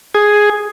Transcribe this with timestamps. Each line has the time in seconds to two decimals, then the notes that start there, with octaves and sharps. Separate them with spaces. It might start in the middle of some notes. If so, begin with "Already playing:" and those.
0.15 G#4